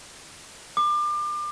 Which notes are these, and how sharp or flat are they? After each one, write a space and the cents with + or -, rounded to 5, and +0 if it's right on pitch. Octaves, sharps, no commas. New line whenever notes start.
D6 +30